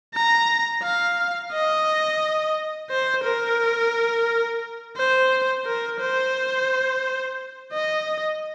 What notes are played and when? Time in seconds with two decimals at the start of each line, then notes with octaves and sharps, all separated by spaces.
0.15 A#5
0.83 F5
1.52 D#5
2.91 C5
3.24 A#4
4.97 C5
5.66 A#4
6.01 C5
7.73 D#5